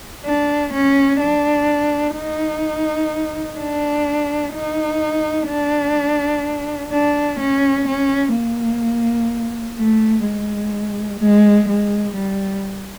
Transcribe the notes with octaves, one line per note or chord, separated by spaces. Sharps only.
D4
C#4
D4
D#4
D4
D#4
D4
D4
C#4
C#4
A#3
A3
G#3
G#3
G#3
G3